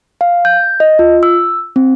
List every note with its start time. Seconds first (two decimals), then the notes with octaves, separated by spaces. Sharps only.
0.21 F5
0.45 G6
0.80 D#5
0.99 F4
1.23 E6
1.76 C4